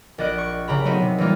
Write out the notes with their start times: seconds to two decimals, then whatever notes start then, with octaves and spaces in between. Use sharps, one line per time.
0.18 A#1 D5 D#5 F#6 D7
0.38 C#6
0.68 C#3 G4 A#5 B5
0.84 F#3 A3 B3 C4 D#4
1.02 C3
1.18 E3 G3 A#3 D#4 F4